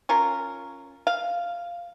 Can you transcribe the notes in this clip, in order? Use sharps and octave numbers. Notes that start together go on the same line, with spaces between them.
C#4 F4 A#4
F5